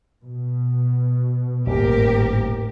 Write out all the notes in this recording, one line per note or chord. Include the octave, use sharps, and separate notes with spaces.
B2
D#1 G#1 A2 G4 A#4